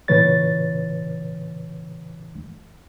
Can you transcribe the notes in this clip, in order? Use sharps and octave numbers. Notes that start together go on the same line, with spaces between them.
A#2 C#3 E3 B4 C#5 A6